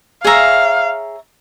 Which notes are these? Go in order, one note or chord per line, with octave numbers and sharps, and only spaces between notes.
G#4 C#5 E5 F5 A#5